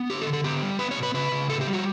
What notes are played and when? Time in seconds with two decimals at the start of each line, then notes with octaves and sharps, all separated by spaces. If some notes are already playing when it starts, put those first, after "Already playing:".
Already playing: B3
0.10 D3 G4
0.22 A4
0.27 D3
0.33 A4
0.44 B3 G4
0.63 G3
0.79 B3 B4
0.91 C#5
0.97 B2
1.03 B4
1.14 C#3 B4
1.32 C#3
1.49 A2 A4
1.61 G4
1.67 G3
1.73 F#4